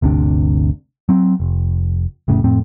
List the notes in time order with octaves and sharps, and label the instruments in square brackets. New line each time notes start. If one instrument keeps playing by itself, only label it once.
[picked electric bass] G1 D2 C3 D4
F#3 C4
F1
F1 A2 C#3
F2 A2 C4